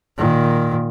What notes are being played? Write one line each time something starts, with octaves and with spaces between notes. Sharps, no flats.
A#2 D#3